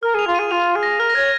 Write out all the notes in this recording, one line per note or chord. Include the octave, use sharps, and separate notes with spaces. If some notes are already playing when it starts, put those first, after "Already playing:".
A#4 F6
G#4 F7
F4
G#4 D#7
F4 F7
G#4
A#6
A#4 F6
A#6
C#5 G#6